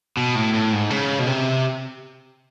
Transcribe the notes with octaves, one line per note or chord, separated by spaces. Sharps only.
B2
A2
A2
G#2
C#3
B2
C3